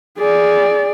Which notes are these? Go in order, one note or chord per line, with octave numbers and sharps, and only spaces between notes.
G#4 D5